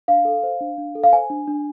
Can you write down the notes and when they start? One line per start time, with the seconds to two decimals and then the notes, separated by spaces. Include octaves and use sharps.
0.08 D4 F5
0.25 A4
0.43 C5
0.61 D4
0.78 D4
0.95 A4
1.03 F5
1.12 C5 G#5
1.30 D4
1.47 D4